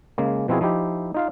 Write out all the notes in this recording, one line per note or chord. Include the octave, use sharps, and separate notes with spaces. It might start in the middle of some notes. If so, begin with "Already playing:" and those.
C#3 G#3 A#3
B2 F3 C4 E4 F#4 G#4
F3 D#4 E4 G4
D#4 F4 F5